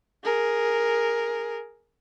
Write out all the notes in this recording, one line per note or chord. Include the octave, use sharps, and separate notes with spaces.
G#4 A#4